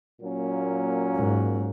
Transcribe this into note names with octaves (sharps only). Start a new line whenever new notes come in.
A#2 F#3 A#3 C#4
G#2